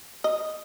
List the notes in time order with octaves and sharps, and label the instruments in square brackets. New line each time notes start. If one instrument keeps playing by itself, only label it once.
[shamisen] D#5